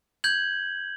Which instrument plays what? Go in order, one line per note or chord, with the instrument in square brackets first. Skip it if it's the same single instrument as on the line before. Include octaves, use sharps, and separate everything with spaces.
[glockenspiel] G6 G#6 F#7